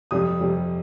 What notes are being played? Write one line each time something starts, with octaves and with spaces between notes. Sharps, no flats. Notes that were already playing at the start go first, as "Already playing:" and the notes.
F2 C3 G3 D#6
F2 C3 G3